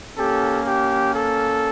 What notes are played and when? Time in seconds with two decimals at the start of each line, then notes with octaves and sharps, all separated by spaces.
0.17 A#3 C#4 G4 A4
0.65 G4
1.13 A4